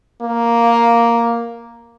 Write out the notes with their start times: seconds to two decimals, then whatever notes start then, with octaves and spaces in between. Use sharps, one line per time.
0.22 A#3